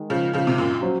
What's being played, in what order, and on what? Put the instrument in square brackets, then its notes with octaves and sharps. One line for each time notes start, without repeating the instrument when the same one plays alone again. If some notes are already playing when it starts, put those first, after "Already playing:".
Already playing: [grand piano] D#3 G#3
[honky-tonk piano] C#3 F3
C#3 F3
C3
F#2 A#2
[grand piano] F#3 C#4 F#4 C5